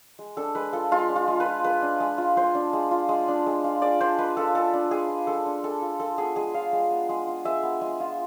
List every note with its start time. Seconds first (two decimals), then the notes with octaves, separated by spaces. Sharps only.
0.19 G#3
0.37 D4 A4
0.55 G#3 B4
0.73 F4 A4
0.91 G#3 F4
1.09 D4
1.16 F4
1.28 G#3
1.40 B4
1.45 F4
1.64 G#3 B4
1.83 D4
2.00 G#3
2.18 F4
2.37 G#3 C5
2.55 D4
2.73 G#3
2.91 F4
3.09 G#3
3.28 D4
3.46 G#3
3.64 F4
3.82 G#3 D5
4.00 D4 C5
4.18 G#3 B4
4.37 F4 A4
4.55 G#3 A4
4.74 D4
4.91 G#3 G#4
5.09 F4
5.27 G#3 A4
5.46 D4
5.63 G#3 A4
5.81 F4
6.00 G#3 A4
6.18 B3 G#4
6.36 G#3 G#4
6.54 F4 F5
6.73 G#3
6.91 B3
7.09 G#3
7.27 F4
7.45 G#3 E5
7.63 B3
7.81 G#3
8.00 F4